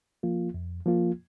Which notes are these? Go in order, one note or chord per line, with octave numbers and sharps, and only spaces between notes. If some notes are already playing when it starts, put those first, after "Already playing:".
F3 A#3 F4
F2
F3 A#3 F4